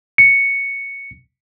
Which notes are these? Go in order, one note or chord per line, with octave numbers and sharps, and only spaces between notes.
C#7